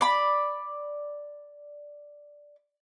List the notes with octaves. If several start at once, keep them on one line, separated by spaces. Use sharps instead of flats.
D5 B5